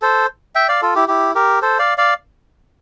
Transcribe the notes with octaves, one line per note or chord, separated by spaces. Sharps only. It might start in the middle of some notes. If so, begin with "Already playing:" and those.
A4 C5
E5 G5
D5 F5
F4 A4
E4 G4
E4 G4
G4 A#4
A4 C5
D5 F5
D5 F5